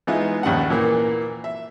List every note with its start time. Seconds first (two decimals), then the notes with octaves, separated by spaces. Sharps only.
0.07 E3 G#3 B3 D#4 F4 E5
0.43 A#1 D#2 C#3 F#5
0.70 A#2 E3 A#3
1.44 E5